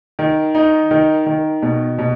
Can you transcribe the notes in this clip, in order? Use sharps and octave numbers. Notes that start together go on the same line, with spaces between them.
D#3
D#4
D#3
D#3
B2
B2